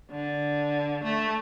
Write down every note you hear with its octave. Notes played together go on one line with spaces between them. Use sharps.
D3
A3